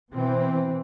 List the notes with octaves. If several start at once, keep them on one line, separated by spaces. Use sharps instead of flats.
B2 E3 C4